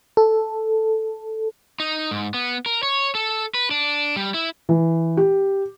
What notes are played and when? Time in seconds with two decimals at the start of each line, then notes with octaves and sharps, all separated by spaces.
0.17 A4
1.80 D#4
2.11 G#2
2.34 B3
2.66 A#4
2.83 C#5
3.15 A4
3.54 B4
3.71 D4
4.16 G3
4.34 E4
4.69 E3
5.17 G4